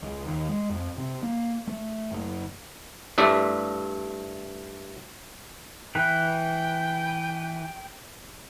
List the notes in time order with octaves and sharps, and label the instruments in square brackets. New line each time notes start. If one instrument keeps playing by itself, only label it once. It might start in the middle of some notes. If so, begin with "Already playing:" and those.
[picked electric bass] C#2
D#2
G#3
F2
C3
A#3
A3
F#1
[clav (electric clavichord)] G2 A3 E4 D5 E5
[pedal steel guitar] E3 B4 [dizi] G5